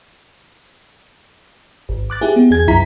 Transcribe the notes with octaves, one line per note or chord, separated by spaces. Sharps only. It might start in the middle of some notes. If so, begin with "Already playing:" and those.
G#1
D6 F#6 A6
E4 G4 G#4
B3
E2 G#4 G#6
C2 F#2 E4 A#5 B6